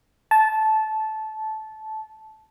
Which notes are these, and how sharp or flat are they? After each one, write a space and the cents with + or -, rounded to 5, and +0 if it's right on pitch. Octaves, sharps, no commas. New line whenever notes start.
A5 -15